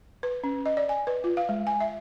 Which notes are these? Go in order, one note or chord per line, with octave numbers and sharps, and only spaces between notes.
B4
C#4
D#5
D5
G#5
B4
F4
F5
G#3
G#5
E5